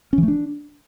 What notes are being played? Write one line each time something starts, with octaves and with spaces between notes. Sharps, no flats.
C#4
E3
A3
D4